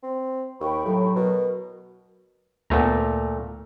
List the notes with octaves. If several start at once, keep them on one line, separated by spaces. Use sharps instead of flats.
C4
D#2 G5 B5 C#6
A2 F#3
B2 A#4
D2 A#2 A3 B3 A#5